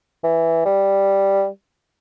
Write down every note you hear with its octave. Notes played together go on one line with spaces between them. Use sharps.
E3
G3